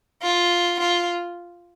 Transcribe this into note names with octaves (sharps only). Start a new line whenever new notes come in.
F4
F4